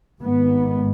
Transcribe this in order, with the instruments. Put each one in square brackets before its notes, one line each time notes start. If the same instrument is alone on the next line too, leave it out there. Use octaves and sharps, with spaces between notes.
[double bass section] G#1 G#2 B3